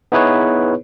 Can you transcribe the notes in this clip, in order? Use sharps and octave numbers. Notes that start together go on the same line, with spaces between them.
B3 D#4 E4 G#4 B4 C#5